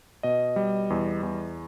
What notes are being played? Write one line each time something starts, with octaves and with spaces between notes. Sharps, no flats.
B2 D#5
G3
E2
E2